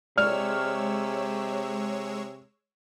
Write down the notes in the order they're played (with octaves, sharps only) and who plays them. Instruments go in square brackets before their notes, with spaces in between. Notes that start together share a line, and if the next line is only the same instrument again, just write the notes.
[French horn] C3 [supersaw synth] G#3 C#5 E6 [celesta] D5 [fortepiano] F6